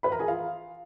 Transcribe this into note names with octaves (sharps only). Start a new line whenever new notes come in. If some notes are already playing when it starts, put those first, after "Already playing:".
B4 B5
A#4 A#5
G#4 G#5
F4 F5